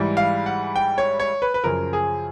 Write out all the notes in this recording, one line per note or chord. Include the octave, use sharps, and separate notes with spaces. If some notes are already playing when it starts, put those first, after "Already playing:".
Already playing: G#2 E3 G3
F5
F#5
G5
C#5
C#5
B4
B4
F#2 C#3 F3 A#4
G#4